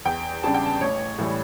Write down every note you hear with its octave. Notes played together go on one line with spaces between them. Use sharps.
E2 G5
C#3 G3 D4 A5
G5
A5
A1 C#5
A2 E3 G3